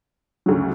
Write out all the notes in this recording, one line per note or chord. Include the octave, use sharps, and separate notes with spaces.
D2 C#3 F#3